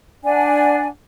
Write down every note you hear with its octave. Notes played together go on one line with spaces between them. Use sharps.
D4 D5 F#5 G#5